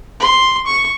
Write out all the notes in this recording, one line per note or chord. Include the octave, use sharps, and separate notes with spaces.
C6
C#6